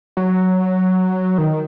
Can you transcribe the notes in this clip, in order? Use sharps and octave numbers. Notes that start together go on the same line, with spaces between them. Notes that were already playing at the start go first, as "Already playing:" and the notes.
F#3
D#3